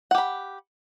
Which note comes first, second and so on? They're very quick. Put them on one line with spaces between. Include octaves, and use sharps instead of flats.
F#5 G4 B5